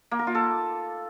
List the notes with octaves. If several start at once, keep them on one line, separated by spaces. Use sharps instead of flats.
A#3
A#4
F4
A4